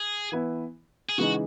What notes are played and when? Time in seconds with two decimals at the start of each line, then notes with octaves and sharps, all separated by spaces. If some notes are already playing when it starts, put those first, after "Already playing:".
Already playing: G#4
0.32 E3 B3 E4
1.09 G#4
1.18 C#3 E3 G#3 D#4 F#4